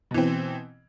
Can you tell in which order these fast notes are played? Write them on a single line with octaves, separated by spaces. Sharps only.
B2 E3 C4